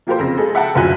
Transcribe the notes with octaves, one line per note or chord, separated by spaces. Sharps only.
F3 A#3 G4 A4 A#4 C5
F2 C#3 A#6
G#3 G#4 A4
E5 F#5 G5 A5
F#1 D2 F3 F#3 G#5 F#6